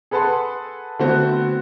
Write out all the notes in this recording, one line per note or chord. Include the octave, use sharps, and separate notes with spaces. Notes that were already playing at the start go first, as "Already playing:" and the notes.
G#4 A4 B4 F#5 A5 C6
D3 A3 B3 C4 F#4 C5